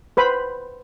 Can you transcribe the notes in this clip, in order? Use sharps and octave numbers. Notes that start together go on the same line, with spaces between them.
B4 C5 B5